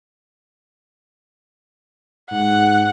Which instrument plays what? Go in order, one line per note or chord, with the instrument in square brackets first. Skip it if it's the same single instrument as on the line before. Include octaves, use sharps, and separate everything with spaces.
[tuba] G#2 [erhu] F#5